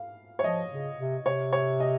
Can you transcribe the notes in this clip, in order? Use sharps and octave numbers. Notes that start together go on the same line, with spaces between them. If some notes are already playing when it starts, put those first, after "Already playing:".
Already playing: F5
C#5
F3 D#5
C#3
C3
C3 C#5
C#5
D#5